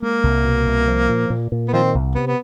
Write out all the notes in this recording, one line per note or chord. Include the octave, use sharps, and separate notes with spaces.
G#3 A#3
C2
B2
C2
F3
A#2
A#2
A#2
B3
D#3 F3 C4
C2
C3 B3
B3